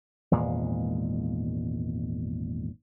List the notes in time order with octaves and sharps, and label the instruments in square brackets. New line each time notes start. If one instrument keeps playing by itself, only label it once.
[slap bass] G#1 E2 A#2 G#3